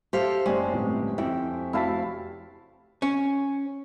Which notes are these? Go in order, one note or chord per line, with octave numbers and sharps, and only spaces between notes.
G4 A4 C5 F5
F#1 G#3 C#4 G4 D5
G1 F2 A2
F2 E4 G5
F1 E4 F#4 F5 A5 B6
C#4